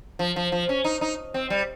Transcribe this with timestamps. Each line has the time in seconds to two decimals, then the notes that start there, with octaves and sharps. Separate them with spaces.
0.19 F3
0.36 F3
0.52 F3
0.69 C#4
0.84 D#4
1.01 D#4
1.34 C4
1.50 G3